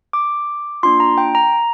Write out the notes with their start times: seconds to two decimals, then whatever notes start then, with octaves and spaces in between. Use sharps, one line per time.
0.13 D6
0.83 A#3 D4 F4 C6
1.00 A#5
1.18 G5
1.35 A#5